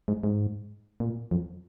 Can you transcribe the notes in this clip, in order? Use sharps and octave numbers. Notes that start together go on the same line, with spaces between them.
G#2
G#2
A#2
F2